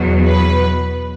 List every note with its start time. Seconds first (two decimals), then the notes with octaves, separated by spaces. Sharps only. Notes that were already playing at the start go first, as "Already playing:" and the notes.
Already playing: E2 B2 F#3
0.25 B4